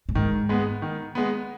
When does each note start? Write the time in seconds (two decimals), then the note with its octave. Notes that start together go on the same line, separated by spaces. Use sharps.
0.09 A2
0.15 G#2 D#3
0.49 G#3 B3
0.82 D#3
1.15 G#3 B3